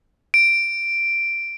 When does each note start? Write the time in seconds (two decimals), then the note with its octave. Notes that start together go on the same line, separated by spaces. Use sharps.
0.34 D7